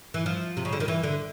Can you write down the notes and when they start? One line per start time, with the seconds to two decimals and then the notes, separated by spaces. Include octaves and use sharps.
0.14 E3
0.26 F3
0.57 C3
0.65 C#3
0.73 D3
0.80 D#3
0.88 E3
1.03 D3